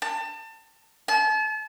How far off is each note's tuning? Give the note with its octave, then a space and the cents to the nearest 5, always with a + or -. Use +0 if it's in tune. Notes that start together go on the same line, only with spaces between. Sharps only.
A5 +30
A5 -35